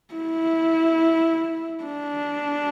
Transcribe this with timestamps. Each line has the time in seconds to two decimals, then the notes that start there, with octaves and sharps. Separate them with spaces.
0.14 E4
1.84 D4